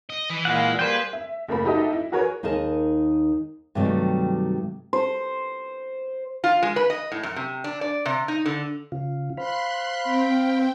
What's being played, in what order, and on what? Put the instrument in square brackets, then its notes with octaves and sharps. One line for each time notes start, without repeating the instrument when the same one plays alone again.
[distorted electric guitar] D#5
E3
[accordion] A#2 F5 [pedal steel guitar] G#3 F#5
[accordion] G3 A#3 [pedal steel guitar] G#4 C5 G5 [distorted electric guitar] B4
[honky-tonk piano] E5
F#1 A3 A#3 B5
D#4 F#4 G4 A4 D#5 E5
E4
F#4 G#4 A#4 B4 C#5
[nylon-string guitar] D#2 D#4 G#4 A#4 A5
G2 C3 D#3 F#3 G3 A3
[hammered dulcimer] C5
[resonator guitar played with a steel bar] F4
G#3
B4
D#5
A2
F#2
C3
D4
D5
C3
D#4
D3
[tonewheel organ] C#3 F4
[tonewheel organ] C5 F5 B5 [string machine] C6 F#6
[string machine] C4 G5